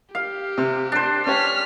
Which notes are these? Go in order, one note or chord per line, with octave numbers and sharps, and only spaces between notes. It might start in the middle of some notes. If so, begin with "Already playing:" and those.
G4 F5
C3
D4 C5
C#4 G4 C#5 F6 B6